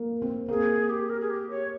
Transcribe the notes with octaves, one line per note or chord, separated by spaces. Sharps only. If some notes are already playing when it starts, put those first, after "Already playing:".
Already playing: A#3
C4
A#3 G#4
G4
A#4
G#4
G4
C#5